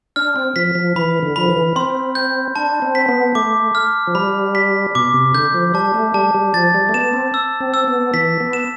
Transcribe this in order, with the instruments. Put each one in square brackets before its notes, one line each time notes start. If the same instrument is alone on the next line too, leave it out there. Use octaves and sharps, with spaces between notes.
[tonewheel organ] D4 [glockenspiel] F6
[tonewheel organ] C4
[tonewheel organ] F3 [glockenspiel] B6
[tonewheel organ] F3
[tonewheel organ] E3 [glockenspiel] B5
[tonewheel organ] D3
[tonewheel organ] F3 [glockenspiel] B5
[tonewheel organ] E3
[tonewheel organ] C4 [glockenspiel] C6
[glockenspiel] G6
[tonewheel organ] D4 [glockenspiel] A5
[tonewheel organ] C4
[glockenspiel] B6
[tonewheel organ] B3
[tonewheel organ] A3 [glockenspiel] D6
[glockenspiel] F6
[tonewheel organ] F3
[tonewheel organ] G3 [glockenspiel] B5
[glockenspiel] B6
[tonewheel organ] B2 [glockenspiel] D6
[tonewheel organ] C3
[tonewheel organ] D3 [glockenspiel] G6
[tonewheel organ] F3
[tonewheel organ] G3 [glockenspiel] A5
[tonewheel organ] A3
[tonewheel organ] G3 [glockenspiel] A5
[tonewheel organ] G3
[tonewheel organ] F3 [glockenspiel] A6
[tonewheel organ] G3
A3
[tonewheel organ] B3 [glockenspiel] E7
[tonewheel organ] C4
[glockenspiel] E6
[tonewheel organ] C4
[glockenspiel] E6
[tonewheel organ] B3
[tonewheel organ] E3 [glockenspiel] B6
[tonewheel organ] B3
[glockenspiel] E7